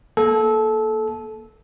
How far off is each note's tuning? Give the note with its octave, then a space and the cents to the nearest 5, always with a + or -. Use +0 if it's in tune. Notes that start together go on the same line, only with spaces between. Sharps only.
A#3 +15 A4 -20